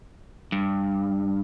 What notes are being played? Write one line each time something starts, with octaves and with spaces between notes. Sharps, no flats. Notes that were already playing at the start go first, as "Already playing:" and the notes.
G2